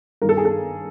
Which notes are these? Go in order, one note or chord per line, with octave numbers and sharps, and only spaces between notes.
G2 D#3 A#4
A4
G#4
A4